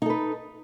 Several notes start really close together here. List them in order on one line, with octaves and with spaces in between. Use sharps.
D#4 A4 B4